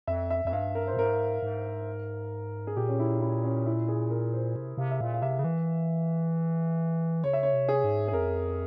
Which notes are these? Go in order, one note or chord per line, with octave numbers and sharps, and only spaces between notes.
F2 E5
E5
F2 E5
G2 F5
A#4
C5
A#2
G#2 A#4
G#2
G#4
A#2 G4
C#4
E4
E4
C#4
E4
G#4
A#4
C5
C3
C3 F5
E5
A#2 F5
F5
C3 E5
C#3
E3
C#3 C#5
E5
C#5
C3
G#4
G#2
G#4
F2 A#4